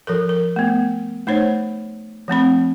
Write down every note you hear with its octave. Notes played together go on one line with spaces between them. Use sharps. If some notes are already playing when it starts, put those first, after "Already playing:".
F3 A4 A#4
A#4
A3 B3
A3 D#4 C5 C#5
F3 A3 C4 B5